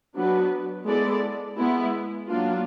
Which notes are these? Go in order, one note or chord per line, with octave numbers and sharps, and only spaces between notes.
F#3 B3 D4 F#4 B4
G#3 B3 E4 A4 D5
G#3 B3 E4
F#3 A#3 D4 F4